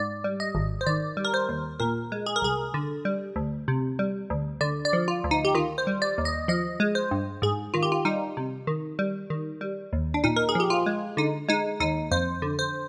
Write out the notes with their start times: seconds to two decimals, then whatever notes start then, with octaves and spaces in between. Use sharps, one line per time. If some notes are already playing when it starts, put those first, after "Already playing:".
Already playing: G#2 D5
0.24 G3
0.40 D#5
0.55 G#1
0.81 C5
0.87 D#3 D5
1.17 G3
1.25 A#4
1.34 C5
1.49 D#2
1.80 A#2 A#4
2.12 G#3
2.26 G#4
2.36 A#4
2.42 C2 G#4
2.74 D3
3.05 G3
3.36 D2
3.68 C3
3.99 G3
4.30 D2
4.61 D3 D5
4.85 D5
4.93 F3
5.08 F4
5.24 D2
5.31 D#4
5.45 G4
5.55 D#3 F4
5.78 C5
5.87 G3
6.02 D5
6.18 D#2
6.25 D#5
6.48 F3 D#5
6.80 G#3
6.95 C5
7.11 G2
7.42 G#2 G#4
7.74 D#3 F4
7.83 G4
7.92 F4
8.05 G3 D#4
8.37 C3
8.67 D#3
8.99 G3
9.30 D#3
9.61 G3
9.93 D#2
10.14 D4
10.24 A#2 D#4
10.36 A#4
10.49 G#4
10.55 F3 G4
10.70 F4
10.86 G#3
11.17 D3 D#4
11.49 G#3 D#4
11.80 D#2 D#4
12.11 F2 C5
12.42 D3
12.59 C5